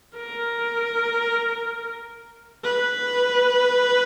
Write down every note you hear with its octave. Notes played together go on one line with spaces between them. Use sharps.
A#4
B4